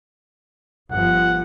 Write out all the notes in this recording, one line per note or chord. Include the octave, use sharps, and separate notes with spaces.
G1 F3 F#5